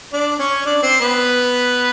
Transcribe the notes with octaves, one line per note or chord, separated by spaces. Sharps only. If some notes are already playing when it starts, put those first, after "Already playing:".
D4 D5
C#4 C#5
D4 D5
C4 C5
B3 B4